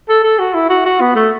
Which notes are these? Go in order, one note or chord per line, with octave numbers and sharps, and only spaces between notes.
A4
A4
F#4
E4
F#4
F#4
B3
A3